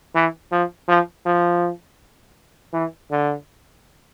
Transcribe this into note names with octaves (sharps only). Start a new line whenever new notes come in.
E3
F3
F3
F3
E3
D3